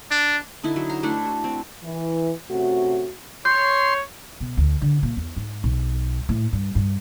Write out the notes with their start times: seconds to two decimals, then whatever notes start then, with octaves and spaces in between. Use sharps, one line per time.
0.11 D4
0.63 D3 D#4 E4
0.76 F#3
0.89 C5 A#5 C6
1.03 A3 D4 E4 A4
1.25 F#4
1.44 C4
1.84 E3
2.50 C3 A3 C#4 F#4
3.45 C#5 C6 G6
4.40 B2
4.57 D2
4.82 D3
5.03 A#2
5.17 E2
5.36 G#2
5.64 B1
6.29 A2
6.53 G2
6.75 G2